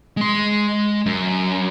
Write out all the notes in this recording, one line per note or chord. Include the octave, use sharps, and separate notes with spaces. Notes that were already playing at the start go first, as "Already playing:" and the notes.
G#3 C6
F#2